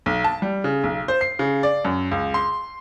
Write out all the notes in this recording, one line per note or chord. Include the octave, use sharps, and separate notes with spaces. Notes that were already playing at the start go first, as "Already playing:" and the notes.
B1
A5
G3
C#3
B1
C5
C7
C#3
D5
F#2
C#2
C6